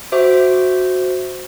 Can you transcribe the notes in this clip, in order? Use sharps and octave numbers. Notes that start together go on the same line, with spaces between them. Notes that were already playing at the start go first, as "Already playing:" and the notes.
F#4 C5 E5 D6